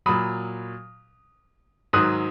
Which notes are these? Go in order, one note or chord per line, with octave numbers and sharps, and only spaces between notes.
A#2 F#3 B5 D#6
G#2 D#3 F#3 D#6 F#6